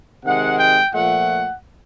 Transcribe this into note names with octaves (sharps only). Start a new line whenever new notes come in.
C3 D#3 G#3 F#5
G5
A#2 F3 A3 F#5